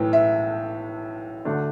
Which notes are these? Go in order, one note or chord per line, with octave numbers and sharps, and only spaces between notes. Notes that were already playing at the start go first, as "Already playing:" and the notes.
Already playing: B1 A2 E3 G5
E5
D2 D3 A3 D4